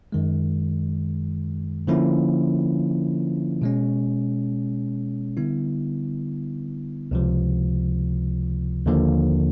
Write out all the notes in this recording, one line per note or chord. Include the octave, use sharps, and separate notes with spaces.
F#2 D#3 G#3
D3 F3 A#3 C#4 E4
B2 G#3 C#4
D3 G3 B3 E4
C#2 C3 F3
D#2 D3 F3 A#3